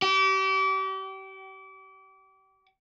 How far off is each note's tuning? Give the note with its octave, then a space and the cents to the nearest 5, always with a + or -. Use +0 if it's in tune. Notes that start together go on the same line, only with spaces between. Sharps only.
G4 -35